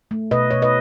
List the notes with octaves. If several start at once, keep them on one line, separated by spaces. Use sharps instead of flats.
A3
B2 B4 D#5
B2 C#5
B4 D#5